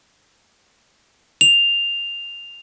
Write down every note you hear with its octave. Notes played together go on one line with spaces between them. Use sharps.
F7